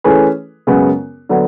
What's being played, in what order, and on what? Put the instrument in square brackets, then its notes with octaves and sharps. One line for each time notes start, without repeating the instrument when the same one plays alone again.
[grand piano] E3 A3 C#4 G#4 B4
F#2 C#3 G#3 B3
D3 F#3 B3